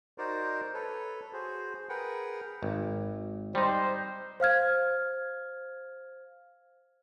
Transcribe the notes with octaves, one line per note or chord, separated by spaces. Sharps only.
D#4 F#4 A#4 C5 D5
A4 B4 C#5
F#4 G#4 C5
G#4 A#4 B4 F#5 G5
G#1
G3 D#4 C5
C5 F5 F6 G#6